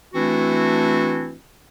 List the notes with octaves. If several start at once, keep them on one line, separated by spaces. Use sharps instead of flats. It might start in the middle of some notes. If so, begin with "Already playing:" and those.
E3 A3 C4 D4 E4 F#4